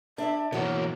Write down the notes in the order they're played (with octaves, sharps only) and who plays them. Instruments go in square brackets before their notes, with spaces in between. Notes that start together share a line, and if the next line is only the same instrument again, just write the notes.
[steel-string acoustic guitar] D4 [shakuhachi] E5
[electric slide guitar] B2 E3 A#3 [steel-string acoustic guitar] F#4 C#5 [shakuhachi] A#4